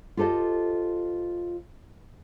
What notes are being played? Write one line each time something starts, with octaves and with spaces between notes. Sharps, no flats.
F4 G4 A4 C5 D#5